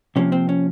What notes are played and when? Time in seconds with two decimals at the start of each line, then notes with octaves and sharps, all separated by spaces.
0.16 C3 F3 A#3 C#4
0.32 C4
0.49 C#4